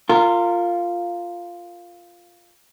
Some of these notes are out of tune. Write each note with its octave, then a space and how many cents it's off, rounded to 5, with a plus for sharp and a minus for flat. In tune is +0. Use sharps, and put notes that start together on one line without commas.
F4 +0 A#4 -25